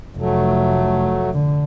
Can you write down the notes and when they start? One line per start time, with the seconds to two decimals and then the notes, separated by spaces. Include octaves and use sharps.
0.17 F1 F#3 A3
1.33 D3